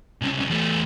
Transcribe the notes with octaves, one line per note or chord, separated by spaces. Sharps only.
C2 C#3
E2 A3